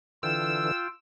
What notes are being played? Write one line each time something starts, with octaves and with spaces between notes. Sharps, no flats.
D3 E3 F4 G5 E6